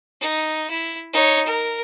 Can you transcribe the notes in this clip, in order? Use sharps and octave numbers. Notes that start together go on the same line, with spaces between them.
D#4
E4
D#4 C#5
A#4